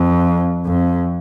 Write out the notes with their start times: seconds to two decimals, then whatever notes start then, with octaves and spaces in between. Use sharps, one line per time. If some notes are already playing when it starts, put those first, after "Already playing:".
Already playing: F2
0.66 F2